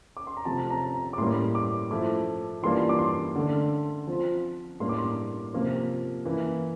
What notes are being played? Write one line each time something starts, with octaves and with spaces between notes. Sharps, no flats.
D6
C6
A#5
C3 F3 A3 A5
A#5
A#5
D6
A2 G3 A#3 C6
D6
F3 A3 E4 D6
E3 G3 A#3 D4 F4 C6
D6
C6
D3 A3 D4
F3 C4 F4
A2 G3 A#3 D4 C6
D6
C6
C3 F3 A#3 F4
E3 A#3 E4